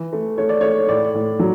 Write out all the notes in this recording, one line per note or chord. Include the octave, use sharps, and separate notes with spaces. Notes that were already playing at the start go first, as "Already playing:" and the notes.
Already playing: E3
A3
A3 C#5
D5
A3 C#5
A2 D5
A2
F#3